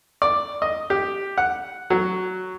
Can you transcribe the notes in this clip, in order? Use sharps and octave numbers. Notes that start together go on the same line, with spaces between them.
D5
D#5
G4
F#5
F#3